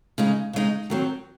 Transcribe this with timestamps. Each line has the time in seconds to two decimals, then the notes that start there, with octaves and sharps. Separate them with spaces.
0.18 C#3 G#3 D#4
0.53 C#3 G#3 D#4
0.90 D#3 F#3 C4